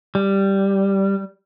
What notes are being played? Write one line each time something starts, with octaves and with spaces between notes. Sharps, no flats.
G3